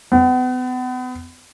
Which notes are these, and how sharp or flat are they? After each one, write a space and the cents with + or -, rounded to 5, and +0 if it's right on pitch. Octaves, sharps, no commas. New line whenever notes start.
B3 +35